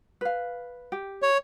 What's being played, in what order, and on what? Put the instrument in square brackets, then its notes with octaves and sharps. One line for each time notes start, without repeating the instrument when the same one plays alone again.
[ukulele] B4 F5
G4
[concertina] C#5